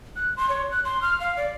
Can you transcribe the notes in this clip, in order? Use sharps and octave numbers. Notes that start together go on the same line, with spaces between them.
F#6
C6
C#5
F#6
C6
F6
F5
D5